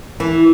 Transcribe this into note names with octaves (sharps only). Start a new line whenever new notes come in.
E3